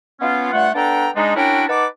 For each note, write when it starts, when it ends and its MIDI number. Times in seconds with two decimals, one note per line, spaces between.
0.20 0.49 59
0.20 0.49 61
0.20 0.49 65
0.53 0.69 43
0.53 0.69 57
0.53 0.69 65
0.53 0.69 78
0.75 1.09 59
0.75 1.09 62
0.75 1.09 69
0.75 1.09 74
0.75 1.09 79
0.75 1.09 82
1.16 1.32 56
1.16 1.32 62
1.16 1.32 63
1.35 1.64 61
1.35 1.64 62
1.35 1.64 64
1.35 1.64 66
1.35 1.64 70
1.35 1.64 79
1.68 1.86 63
1.68 1.86 71
1.68 1.86 78
1.68 1.86 81
1.68 1.86 86